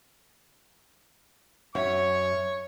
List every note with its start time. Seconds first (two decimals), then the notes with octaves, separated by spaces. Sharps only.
1.75 F#2 F#4 C#5 E5 C#6